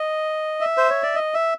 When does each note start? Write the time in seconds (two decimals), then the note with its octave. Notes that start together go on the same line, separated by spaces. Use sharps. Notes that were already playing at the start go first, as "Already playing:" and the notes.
Already playing: D#5
0.61 E5
0.77 C5
0.90 C#5
1.03 D5
1.15 D#5
1.34 E5